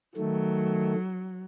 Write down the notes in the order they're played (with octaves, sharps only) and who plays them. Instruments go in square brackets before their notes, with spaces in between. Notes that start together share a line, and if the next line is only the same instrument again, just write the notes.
[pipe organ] D#3 A3 [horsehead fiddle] F#3